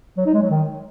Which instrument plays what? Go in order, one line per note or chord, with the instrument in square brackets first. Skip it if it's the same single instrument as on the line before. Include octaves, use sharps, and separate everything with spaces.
[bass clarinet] F#3
D#4
G#3
F#3
D#3